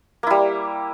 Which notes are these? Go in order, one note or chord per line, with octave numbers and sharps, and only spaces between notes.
G3 A#3 E4